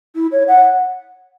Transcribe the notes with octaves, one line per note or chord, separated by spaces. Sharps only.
E4
C#5
F#5